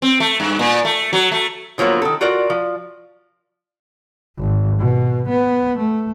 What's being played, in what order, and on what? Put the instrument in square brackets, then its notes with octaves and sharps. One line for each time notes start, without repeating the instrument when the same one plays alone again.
[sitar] C4
A3
G2
A#2
A3
F#3
A3
[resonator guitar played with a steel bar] D3 F3 F#3 A#3 B3
D#3 A4
F4 F#4 A#4 D5
F3
[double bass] G#1
B2
B3
A3